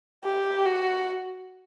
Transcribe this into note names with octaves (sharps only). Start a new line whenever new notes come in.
G4
F#4